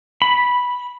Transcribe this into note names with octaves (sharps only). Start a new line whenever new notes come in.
B5